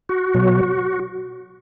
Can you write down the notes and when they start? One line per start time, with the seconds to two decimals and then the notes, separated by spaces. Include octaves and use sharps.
0.09 F#4
0.34 B2 F#3